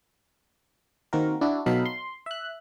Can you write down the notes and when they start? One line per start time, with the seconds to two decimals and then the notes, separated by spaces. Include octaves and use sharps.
1.13 D#3 A#3 C4 F#4 A#4
1.41 D4 E4 F#4
1.66 B2 F#3 D#4 A4 F5 B5
1.86 C6
2.26 E5 F#6